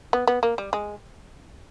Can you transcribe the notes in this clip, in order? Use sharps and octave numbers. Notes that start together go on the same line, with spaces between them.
B3
B3
A#3
G3
G#3